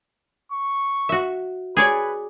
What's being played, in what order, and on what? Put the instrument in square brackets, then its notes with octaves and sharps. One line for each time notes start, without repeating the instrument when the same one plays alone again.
[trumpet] C#6
[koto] F#4 E5
[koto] G#4 C#5 D5 [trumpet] B4